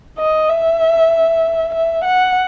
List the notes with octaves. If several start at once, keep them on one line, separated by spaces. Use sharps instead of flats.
D#5
E5
E5
F#5